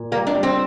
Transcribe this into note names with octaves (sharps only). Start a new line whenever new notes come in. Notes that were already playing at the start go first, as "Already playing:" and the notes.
Already playing: A#2
G3 A#3
D4
G3
C4